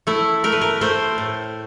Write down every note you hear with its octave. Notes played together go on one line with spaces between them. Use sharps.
A3 E4
A3 A#4
B4
A#4
A3 C5
A2